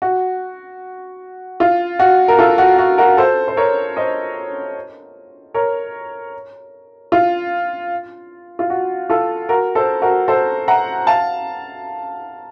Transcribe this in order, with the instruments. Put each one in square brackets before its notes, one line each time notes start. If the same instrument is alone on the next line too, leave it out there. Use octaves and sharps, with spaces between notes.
[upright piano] F#4
F4
F#4
A#4
F4 A4
F#4
F#4
F#4 A#4
A4 C5
C5
A#4 C#5
C5 D#5
A#4 C#5
F4
F4
F#4
F4 A4
F#4 A#4
A4 C5
F#4 A#4
A4 C5
F#5 A#5
F5 A5